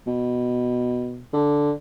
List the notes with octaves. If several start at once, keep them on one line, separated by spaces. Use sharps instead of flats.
B2
D3